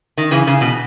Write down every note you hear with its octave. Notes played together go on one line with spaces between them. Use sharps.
D#3
C#3 E3
C#3
B2